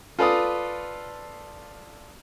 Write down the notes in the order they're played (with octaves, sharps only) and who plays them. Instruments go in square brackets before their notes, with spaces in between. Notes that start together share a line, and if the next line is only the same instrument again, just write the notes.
[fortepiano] F4 A4 B4 D5 F5 D#6